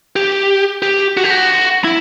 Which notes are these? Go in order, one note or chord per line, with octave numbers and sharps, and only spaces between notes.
G4
G4
F#4
G4
F#4
E4